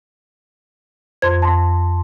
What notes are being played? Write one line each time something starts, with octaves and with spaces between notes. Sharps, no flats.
F2 C5 C6 G#6
A5 C6